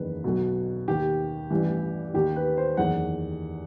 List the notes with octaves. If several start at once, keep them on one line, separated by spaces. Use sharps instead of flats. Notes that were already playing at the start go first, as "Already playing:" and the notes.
Already playing: F#1 E2 D#3 B4
B1 B2
D#2 D#3 G4
A1 G2 E3
D#2 D#3 G4
B4
C5
F#1 E2 D#3 F#5